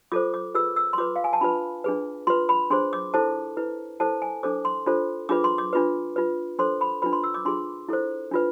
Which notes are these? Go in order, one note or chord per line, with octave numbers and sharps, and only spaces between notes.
F4 A4 C5 D6
D6
F4 G#4 B4 E6
E6
C6
F4 B4 D6
F5
G#5
A5
D4 F4 B4 B5
D4 G#4 B4
F4 B4 C6
B5
D4 G#4 C5 C6
D6
E4 A4 C5 A5
E4 B4
E4 A4 C5 A5
G#5
D4 A4 C5 D6
C6
D4 F4 A4 C5
D4 F4 G#4 B4 D6
C6
D6
D4 F4 B4
F4 B4
D4 A4 C5 C6
B5
D4 F4 B4 B5
C6
E6
D6
D4 F4 G#4 C6
E4 A4 C5
D4 F4 B4